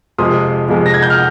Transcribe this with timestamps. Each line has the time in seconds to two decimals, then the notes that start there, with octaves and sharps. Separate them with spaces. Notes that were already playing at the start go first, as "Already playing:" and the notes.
0.18 F2 C3 F3 G#3 C6 D#6
0.68 F2 C3 F3 G#3
0.86 A#6
0.94 G#6
1.02 G6
1.10 F6